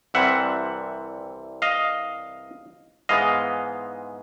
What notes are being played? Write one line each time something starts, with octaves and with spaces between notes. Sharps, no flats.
C2 C3 E3 G3 C4 E5 F#5
D#5 F5
G#2 E3 G#3 B3 D#5 F5